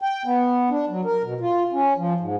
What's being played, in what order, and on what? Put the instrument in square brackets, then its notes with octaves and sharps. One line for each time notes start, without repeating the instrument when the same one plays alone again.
[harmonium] G5
B3
D4
F#3
A#4
B2
F4
C#4
F3
G#2